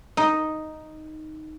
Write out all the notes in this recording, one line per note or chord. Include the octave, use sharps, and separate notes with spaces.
D#4